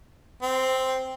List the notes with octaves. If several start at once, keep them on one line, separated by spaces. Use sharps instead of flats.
C4